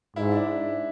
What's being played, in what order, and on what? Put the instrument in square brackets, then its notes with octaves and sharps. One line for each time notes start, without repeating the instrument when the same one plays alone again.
[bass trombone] G#2 [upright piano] E4
[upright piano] D4